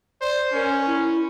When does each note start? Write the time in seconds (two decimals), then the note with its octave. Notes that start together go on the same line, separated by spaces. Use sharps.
0.21 C5 D5
0.53 C#4 A#4
0.86 E4